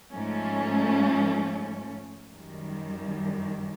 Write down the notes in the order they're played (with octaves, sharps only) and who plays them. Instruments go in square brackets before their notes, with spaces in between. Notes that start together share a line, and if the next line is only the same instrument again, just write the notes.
[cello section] G#2 F3 A3 C#4
F#2 D#3 G3